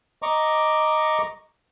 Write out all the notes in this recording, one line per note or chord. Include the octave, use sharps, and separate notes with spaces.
D#5 A#5 C#6 D6